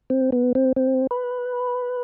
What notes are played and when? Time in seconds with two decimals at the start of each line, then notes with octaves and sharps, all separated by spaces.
0.10 C4
0.32 B3
0.55 C4
0.76 C4
1.11 B4